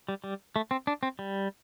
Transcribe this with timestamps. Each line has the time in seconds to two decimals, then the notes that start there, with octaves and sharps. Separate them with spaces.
0.09 G3
0.24 G3
0.56 A3
0.71 C4
0.87 D4
1.03 C4
1.19 G3